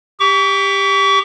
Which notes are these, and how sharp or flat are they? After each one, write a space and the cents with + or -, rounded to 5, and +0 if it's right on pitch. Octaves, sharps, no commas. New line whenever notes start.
G4 +15 C#6 +45